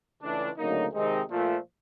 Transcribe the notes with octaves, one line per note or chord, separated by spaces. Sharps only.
C#2 C#3 E3 A3 D4
D2 C#3 F#3 A#3 D#4
C3 D#3 G#3 C4 D#4
A#2 F3 A3